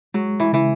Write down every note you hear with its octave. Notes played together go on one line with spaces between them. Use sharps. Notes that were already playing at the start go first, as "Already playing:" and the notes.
F#3 G#3
E3
C#3 E3